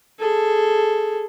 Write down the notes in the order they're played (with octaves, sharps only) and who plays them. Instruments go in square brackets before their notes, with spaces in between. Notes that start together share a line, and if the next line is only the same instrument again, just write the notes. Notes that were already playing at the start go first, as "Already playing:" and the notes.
[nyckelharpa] G#4 A4